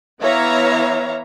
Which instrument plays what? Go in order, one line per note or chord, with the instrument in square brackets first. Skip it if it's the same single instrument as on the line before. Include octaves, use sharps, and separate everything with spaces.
[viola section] E3 B3 C#5 E5 F5 A#5